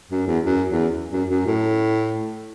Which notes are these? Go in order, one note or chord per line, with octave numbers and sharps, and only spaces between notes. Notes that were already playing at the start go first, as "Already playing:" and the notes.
F#2
E2
F#2
E2
F#2
F#2
A2